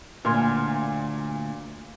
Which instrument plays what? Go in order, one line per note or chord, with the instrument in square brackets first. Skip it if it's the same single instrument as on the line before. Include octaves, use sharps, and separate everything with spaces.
[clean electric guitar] D2 [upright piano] A#2 [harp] G#5 C6 F6